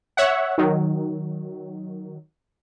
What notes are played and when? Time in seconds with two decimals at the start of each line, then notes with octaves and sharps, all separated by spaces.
0.17 C#5 E5 F#5
0.58 D#3 F#3